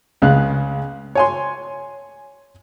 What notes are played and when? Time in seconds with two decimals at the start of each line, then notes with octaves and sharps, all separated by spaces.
0.22 C#2 C#3 F5 F#6
1.15 C#5 G#5 C6